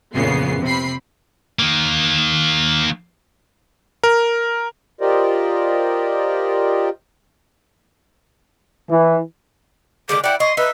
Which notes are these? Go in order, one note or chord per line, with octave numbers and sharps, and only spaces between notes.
F2 A#2 C#3 E3 B3 C7
C3 C4 B5 C7
D#3 A#3
A#4
F4 G4 A#4 C5 D5 D#5
E3
D3 D#3 G#3 D6
E4 D5 F#5 G5
D#5 C6 C#6
D#4 B4 E5